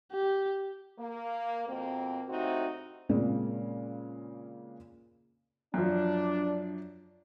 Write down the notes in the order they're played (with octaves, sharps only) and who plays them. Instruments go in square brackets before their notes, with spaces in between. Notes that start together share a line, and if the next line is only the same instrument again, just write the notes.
[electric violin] G4
[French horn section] A#3
F2 B2 A#3 C4
A2 C3 C4 D#4 F#4
[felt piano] A#2 C#3 G#3 A#3 C4
[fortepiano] F#2 F3 [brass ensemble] D4